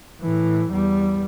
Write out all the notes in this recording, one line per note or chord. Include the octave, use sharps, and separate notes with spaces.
A2 E3
E2 G3